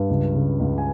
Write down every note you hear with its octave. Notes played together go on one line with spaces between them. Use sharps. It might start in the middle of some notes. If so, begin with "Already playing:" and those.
Already playing: G2
C#2
C#3
C#2
G#5